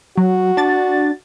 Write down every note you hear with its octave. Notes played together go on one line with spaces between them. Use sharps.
F#3 F#4
D4 A6